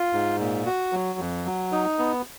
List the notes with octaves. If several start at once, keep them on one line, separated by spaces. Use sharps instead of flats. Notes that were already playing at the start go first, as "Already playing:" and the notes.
Already playing: F4
G#2
A#2
F#4
F#3
F2
F#3
D#4
B3